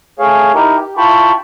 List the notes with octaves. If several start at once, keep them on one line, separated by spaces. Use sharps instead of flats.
A3 G#4 C#5 F5
D#4 E4 G4 A#4
G4
E4 F4 G5 A5 B5 C#6